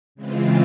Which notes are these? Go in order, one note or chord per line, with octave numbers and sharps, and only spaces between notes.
C#3 E3 G#3 C4 F4